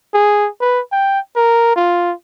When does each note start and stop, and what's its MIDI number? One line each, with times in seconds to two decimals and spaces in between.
0.14 0.48 68
0.61 0.80 71
0.92 1.19 79
1.36 1.72 70
1.76 2.13 65